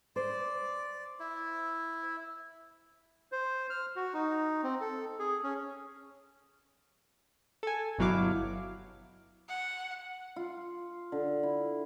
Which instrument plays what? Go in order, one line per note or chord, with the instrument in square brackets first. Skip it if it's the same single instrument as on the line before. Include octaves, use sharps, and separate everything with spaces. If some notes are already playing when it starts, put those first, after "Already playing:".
[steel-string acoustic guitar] C5 [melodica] D5
[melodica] E4
[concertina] C5
F6
F#4
D#4
C4
A4
G#4
C#4
[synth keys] A4 G#5
G1 B2 F#3 E4 F5 D6
[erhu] F#5
[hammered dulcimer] F4
D3
E4